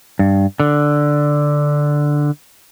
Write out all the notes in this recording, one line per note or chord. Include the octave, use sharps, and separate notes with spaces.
G2
D3